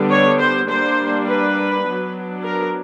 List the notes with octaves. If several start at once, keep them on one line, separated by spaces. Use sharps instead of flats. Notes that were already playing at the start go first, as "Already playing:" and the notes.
Already playing: D3 G3 B3 D4
C#5
C5
G3 A#3 D4 C5
B4
F#3 B3 D4
A#4